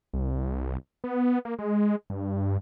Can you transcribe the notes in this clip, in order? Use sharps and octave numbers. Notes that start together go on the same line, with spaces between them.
C2
B3
A#3
G#3
G2